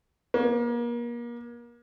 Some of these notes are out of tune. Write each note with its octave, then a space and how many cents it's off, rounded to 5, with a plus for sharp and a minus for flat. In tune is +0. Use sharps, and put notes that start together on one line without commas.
A#3 +35